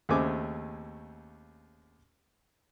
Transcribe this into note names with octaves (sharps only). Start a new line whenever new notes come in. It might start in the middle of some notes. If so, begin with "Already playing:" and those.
D#2 C#3 A3 C4 G#5 D6